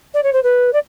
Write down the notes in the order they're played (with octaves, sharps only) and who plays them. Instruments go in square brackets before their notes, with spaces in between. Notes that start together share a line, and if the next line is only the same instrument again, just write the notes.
[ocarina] D5
C#5
C5
B4
D5